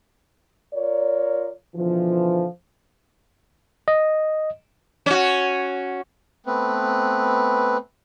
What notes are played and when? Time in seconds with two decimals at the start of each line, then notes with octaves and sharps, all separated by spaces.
0.74 F4 A#4 C#5 D5
1.76 B2 D3 E3 F3
3.88 D#5
5.06 C#4 F#4
6.46 A3 B3 C4 B4